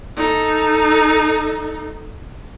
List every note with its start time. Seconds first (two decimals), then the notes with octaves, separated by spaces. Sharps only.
0.16 D#4 A4